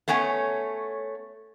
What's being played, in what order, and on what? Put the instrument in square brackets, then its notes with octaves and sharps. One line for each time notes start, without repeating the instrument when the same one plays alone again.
[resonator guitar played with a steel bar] A3 B3 C#4 C#5 G#5